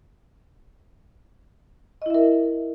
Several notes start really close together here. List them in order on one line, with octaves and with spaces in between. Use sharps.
D#5 E4 E5 A#4